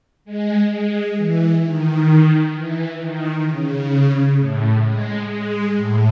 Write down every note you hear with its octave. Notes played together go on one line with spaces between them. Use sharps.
G#3
G#3
E3
D#3
E3
D#3
C#3
A2
G#3
G#3
A2